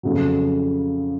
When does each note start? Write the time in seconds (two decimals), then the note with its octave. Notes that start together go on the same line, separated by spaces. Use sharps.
0.03 F2 C#3 F#3